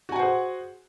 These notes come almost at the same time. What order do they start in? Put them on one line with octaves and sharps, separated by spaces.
F#4 G#5 F#5 C5 G#4